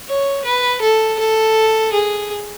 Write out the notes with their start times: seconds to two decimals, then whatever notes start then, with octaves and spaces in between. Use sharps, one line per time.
0.08 C#5
0.45 B4
0.81 A4
1.19 A4
1.93 G#4